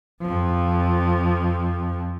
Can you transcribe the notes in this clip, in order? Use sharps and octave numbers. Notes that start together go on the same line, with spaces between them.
F2 F3